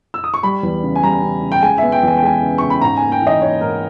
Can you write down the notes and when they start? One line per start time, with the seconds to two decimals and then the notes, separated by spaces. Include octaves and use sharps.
0.14 E6
0.24 D#6
0.34 C#6
0.43 G3 B5
0.63 E2
0.83 C#3
0.96 G#5
1.03 G3 A#5
1.23 C#3
1.43 C#3
1.52 G5
1.62 G#3 G#5
1.78 B3 E5
1.92 G5
2.03 E2 G#5
2.17 G5
2.22 G#3 G#5
2.42 C#3
2.58 C#3 C#6
2.70 B5
2.82 G#2 A#5
2.97 A#3 G#5
3.12 G5
3.22 E3 D#5
3.42 A#3 C#5
3.61 G#2 A#4